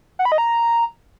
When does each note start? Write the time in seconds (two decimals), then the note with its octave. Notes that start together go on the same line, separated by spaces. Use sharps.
0.19 F#5
0.25 B5
0.32 D#5
0.38 A#5